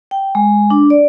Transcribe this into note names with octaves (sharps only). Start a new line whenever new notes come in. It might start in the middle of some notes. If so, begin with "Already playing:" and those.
G5
G#3
D4
D5